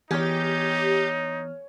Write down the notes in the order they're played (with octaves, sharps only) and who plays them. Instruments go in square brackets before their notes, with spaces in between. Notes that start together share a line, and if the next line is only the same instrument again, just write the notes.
[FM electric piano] E3 B3 F6 [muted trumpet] D#4 [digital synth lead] G4 [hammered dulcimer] C#5 G#5